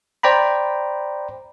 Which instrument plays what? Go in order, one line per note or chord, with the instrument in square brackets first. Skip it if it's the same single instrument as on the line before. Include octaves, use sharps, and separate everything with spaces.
[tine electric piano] C5 D5 G5 A#5 B5